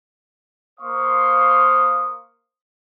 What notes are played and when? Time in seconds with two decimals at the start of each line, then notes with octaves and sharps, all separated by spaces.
0.80 A#3 C5 F5 C6 C#6 D#6